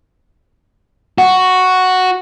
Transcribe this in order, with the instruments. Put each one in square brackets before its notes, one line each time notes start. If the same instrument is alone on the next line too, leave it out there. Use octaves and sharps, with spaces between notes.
[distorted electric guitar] F#4 [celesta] F#5